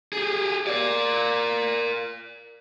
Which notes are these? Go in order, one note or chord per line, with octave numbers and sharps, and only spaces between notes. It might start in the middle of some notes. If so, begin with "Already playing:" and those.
G4 G#4
A#4 D5